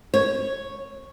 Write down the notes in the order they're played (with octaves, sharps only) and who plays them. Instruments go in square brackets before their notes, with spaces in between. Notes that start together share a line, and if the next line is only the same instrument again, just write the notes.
[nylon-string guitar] C#5